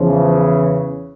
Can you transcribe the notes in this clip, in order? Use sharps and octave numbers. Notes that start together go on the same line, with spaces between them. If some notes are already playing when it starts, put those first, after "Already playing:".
Already playing: E2 C#3 E3 F3